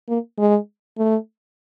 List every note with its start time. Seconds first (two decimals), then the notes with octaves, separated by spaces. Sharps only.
0.09 A#3
0.38 G#3
0.98 A3